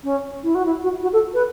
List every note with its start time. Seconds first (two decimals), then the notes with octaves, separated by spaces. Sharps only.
0.04 C#4
0.43 E4
0.55 F#4
0.65 E4
0.83 F#4
1.03 F#4
1.13 A4
1.34 B4